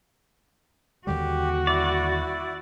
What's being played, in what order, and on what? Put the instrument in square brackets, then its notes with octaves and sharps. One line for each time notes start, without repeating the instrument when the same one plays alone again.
[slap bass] D#2 D3 G3 [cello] F#4 [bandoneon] G4
[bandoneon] E4 [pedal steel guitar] D5